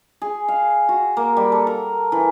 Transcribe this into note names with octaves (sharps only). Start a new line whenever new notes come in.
G#4
F5
F#4
A#3
G3
A4
A#4
E3